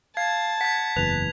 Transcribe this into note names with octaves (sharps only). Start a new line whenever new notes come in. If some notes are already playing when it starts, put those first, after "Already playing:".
F5 A5 G#6
F#5 G#6 B6
F#1 E2 B4 F7